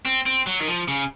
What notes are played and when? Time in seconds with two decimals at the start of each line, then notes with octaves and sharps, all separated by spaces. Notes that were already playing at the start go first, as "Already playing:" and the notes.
0.05 C4
0.26 C4
0.47 F#3
0.60 D#3
0.68 F3
0.88 C#3